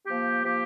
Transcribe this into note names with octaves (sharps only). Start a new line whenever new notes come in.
F3 A#3 G4
F3 A#3 G4